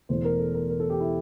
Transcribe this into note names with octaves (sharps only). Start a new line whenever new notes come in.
E1 E2 E3 A3 C5
A#4
A4
A#4
A#4
A4
G4
E4